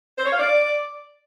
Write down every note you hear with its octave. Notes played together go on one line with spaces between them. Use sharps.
C5
C#5
F5
D5